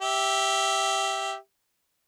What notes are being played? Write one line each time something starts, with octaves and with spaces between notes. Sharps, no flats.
G4 E5